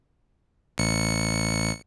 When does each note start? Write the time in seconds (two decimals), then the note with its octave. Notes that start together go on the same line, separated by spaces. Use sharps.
0.78 A1 C#7